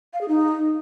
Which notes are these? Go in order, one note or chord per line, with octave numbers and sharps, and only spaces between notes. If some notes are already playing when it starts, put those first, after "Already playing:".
F5
G#4
D#4